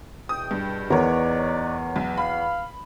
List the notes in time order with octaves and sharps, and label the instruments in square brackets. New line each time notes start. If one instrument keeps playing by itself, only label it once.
[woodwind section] E2 B2 G5 [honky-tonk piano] D#6
[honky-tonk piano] G2
[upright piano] E2 [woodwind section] D#4 B4 D5 [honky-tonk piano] A#4 C#5
[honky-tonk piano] B1
[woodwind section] F5 [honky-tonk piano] B5